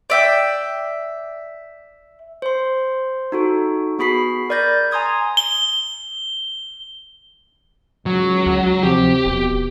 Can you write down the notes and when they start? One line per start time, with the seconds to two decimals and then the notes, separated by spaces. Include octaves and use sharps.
0.10 D5 E5 G5
2.42 C5 C6
3.32 D#4 F#4 A4
3.99 B3 F#4 G#4 B5 B6 C7
4.49 A#4 D5 B5 G6 A6 A#6
4.91 G#5 A#5 C6 D#6 G#6
5.37 G7
8.06 C#2 F#3
8.46 D2
8.83 C3 F3 G4
9.26 D#1 B2